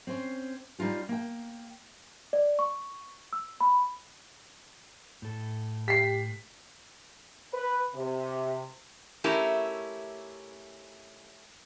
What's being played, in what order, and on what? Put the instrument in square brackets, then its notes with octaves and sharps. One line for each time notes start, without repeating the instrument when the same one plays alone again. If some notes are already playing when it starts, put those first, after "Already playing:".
[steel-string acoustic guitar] C4 C#4 C5
G3 C#4 D#4 F4 G4
A#3 G5
[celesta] D5
C#6
E6
B5
[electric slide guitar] A2 A4
[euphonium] G4 [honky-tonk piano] B6 C7
[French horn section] B4
C3
[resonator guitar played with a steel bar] A3 C#4 E4 G4 A#4